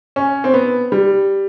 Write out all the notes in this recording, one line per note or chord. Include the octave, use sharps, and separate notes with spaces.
C#4
C4
B3
G3